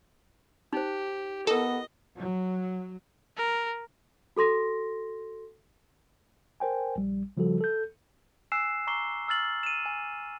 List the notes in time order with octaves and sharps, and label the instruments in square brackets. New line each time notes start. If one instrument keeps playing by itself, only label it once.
[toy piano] D#4 C5 [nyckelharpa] G4
[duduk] B3 [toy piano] E4 A#4 [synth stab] A4 [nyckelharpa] D#5
[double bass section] F#3
[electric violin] A#4
[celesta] F#4 A4 C6 A#6
[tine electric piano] A#4 C5 G5 G#5
A#1 G3
C#3 F3 G3 F#4 A4
A4 G6
[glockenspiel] G#5 E6 F#6 C7 E7
A#5 C#6 D6 C7 G7
E6 F6 A6 F#7
D#7 E7
G#5